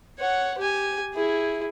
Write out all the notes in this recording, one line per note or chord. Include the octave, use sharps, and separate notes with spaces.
C#5 F#5
G4 G#5
E4 G#4